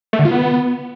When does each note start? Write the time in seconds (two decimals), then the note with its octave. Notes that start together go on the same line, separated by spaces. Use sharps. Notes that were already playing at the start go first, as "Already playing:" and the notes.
0.13 A3
0.19 D3
0.25 F4
0.31 B3